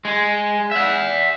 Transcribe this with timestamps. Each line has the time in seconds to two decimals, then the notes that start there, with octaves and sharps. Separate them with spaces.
0.05 G#3
0.72 E5 F#5